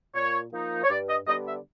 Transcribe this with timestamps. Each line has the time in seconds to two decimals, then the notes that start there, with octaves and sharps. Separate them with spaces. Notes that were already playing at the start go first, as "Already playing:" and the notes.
0.15 A#2 C#5
0.52 F3 A#3 D#4
0.84 C#5
0.90 G2 D5
1.09 D#5
1.28 D3 G3 B3 D4 D#5
1.46 E5